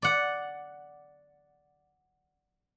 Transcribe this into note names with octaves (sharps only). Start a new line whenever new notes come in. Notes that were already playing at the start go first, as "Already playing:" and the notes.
D5 F#5